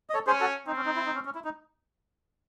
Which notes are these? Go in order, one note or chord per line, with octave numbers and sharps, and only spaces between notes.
D#5
A4 C#5
C#4 G#4 C5
F#4 A4
C4 D#4
C#4
D#4
E4
D#4
C#4
C#4
E4
D#4